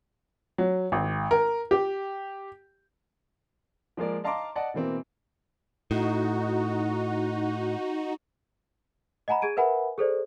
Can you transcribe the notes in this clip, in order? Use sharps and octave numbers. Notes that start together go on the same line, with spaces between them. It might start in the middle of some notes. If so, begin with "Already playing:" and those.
F#3
G#1
A#4
G4
F3 G#3 A#3 A#4 D5
D#5 F5 A5 A#5 C6 D6
D5 D#5 F#5 A5
B2 E3 A#3 C4
A2 D#4 F#4
D#5 F#5 G#5 A#5 B5
G#4 G#6 D7 D#7
A#4 B4 E5 F#5 G#5 B5
G#4 A4 C5 D5